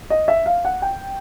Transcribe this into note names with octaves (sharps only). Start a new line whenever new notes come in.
D#5
E5
F5
F#5
G5